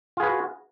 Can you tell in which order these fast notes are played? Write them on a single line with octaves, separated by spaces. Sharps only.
F4 G#4 B4 F#4